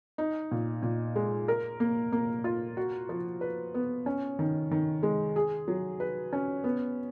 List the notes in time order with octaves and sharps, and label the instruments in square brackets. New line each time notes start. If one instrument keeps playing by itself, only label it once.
[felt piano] D#4
A#2
A#2
G#3
A#4
A#3
A#3
F4
F#4
F3
B4
B3
C#4
D#3
D#3
G#3
G#4
F#3
B4
C#4
B3